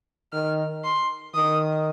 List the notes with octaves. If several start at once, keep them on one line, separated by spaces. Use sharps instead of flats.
D#3 F6
C6
D#3 D#6